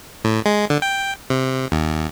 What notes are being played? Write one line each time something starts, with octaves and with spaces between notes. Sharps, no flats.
A2
G#3
D3
G5
C3
D#2